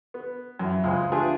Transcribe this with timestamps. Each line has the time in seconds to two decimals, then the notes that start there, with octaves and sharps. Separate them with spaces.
0.14 B3
0.59 F#2 E4
0.84 C#2 G#3 C4
1.12 A3 B3 D4 F4 G4 G#4